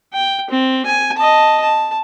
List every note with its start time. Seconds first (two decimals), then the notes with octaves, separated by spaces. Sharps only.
0.13 G5
0.50 C4
0.86 G#5
1.17 D#5 A5
1.62 A5